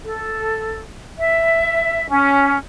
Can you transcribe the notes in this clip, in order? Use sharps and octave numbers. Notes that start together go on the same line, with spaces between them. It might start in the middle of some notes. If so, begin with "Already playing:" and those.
A4
E5
C#4